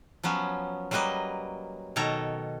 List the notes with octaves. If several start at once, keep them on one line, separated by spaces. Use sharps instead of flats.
F3 F#3 B3 C#4
F#3 G3 A#3 B4 D#5
B2 D#3 A4 C#5 A#5